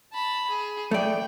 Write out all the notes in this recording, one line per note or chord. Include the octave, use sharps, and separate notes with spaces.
A5 B5
G#4
A3 D5 G5